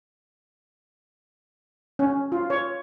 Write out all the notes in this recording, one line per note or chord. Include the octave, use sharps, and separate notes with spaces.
C#4
F4
C#5